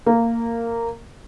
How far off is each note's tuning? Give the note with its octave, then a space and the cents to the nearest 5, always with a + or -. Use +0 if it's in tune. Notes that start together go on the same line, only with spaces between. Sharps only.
A#3 -15